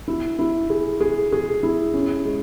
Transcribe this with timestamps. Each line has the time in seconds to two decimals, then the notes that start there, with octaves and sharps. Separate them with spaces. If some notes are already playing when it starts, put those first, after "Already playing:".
0.08 E4
0.39 E4
0.70 G#4
1.01 G#4
1.32 G#4
1.63 E4
1.94 C#4
2.25 G#3